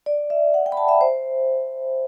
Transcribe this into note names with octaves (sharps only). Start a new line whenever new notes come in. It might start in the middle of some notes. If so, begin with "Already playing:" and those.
D5
E5
F#5
G5
B5
A5
E5
C5